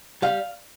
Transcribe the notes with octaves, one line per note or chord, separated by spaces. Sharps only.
G3 F5